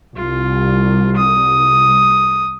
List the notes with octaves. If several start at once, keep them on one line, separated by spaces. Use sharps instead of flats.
C2 F4
D#6